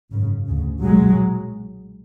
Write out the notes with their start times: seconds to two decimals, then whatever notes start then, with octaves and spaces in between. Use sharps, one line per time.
0.13 G#1 F#2 C#3
0.47 D2 C#3
0.82 B1 A#2 F#3 G#3